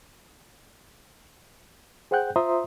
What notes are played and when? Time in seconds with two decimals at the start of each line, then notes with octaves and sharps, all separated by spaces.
2.11 G#4 C5 F#5 G5 F#6 G6
2.36 F4 C5 E5 A#5 C6 D#6